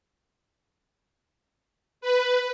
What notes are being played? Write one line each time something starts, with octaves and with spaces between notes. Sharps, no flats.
B4